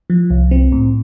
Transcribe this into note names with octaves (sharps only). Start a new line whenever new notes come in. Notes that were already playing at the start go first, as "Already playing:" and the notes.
F3
C2
C4
A2